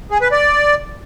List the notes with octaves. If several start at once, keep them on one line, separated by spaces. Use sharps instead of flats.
G#4
B4
D5